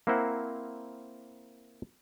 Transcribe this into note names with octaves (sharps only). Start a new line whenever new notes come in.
A#3 C4 E4 A#4 C5 F#5